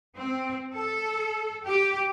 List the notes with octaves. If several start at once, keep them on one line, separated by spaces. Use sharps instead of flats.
C4
A4
G4